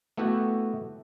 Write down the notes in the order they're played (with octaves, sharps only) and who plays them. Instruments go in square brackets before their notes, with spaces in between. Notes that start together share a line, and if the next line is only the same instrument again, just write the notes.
[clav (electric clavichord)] A3 B3 E4 F#4 G4 A4